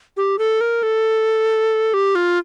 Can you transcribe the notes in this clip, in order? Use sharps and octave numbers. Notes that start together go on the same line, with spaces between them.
G4
A4
A#4
A4
G4
F4